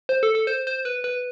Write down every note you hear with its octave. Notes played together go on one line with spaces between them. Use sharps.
C5
A4
A4
C5
C5
B4
B4